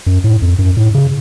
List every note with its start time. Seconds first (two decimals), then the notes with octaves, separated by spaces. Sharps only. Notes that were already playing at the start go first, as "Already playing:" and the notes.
0.07 F#2
0.24 A2
0.42 F2
0.59 F#2
0.77 A2
0.95 C#3